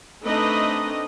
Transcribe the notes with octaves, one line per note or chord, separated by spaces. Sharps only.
A3 C4 D4 D#4 B4 D#5